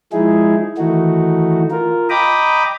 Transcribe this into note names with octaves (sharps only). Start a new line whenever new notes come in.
F3 G#3 D#4 E4 G#4
D#3 E3 A3 D#4 F#4
F4 A#4
D#5 G5 A#5 B5 D6 D#6